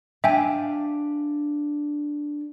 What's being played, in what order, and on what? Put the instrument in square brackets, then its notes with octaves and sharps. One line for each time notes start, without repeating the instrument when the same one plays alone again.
[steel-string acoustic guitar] D4 F5 [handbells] E5 G5 G#5